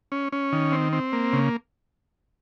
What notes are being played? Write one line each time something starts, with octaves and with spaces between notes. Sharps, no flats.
C#4
C#4
D#3
C4
C4
A#3
C#3